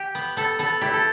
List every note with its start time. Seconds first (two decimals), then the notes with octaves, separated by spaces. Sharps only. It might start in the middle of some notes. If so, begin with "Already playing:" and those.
Already playing: G4
0.15 B3
0.37 B3 A4
0.59 B3 A4
0.81 E4 G4
0.94 A4